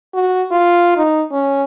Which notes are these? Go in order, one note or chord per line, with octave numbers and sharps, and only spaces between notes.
F#4
F4
D#4
C#4